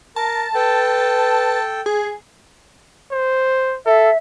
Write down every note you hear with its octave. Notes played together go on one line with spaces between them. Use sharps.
A#4 A5
A4 B4 G5
G#4
C5
A4 E5